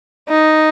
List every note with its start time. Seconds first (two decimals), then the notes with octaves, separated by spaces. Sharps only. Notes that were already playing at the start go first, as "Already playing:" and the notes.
0.29 D#4